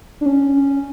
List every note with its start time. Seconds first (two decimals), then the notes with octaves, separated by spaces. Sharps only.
0.21 D4
0.26 C#4